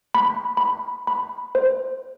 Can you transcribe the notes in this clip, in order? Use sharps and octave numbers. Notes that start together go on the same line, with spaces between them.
B5
B5
B5
C5